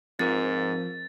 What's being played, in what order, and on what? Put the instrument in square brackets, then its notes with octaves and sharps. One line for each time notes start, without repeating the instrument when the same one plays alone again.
[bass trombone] G#2 [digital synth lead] F3 [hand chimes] C4 A#4 [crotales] A6